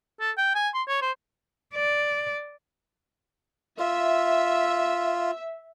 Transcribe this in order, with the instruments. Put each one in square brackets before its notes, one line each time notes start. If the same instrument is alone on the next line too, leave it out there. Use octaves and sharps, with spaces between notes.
[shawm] A4
G5
G#5
C6
C#5
C5
[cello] D5
[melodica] F4 [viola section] E5